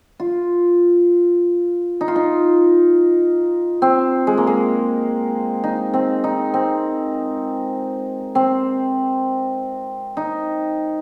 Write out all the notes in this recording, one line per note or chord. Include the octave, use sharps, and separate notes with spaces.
F4
D#4
F4
D#4
C4
G#3
A#3
G#3
D#4
C4
D#4
C4
C4
D#4